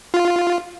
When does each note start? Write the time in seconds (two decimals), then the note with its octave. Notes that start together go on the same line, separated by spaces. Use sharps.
0.14 F4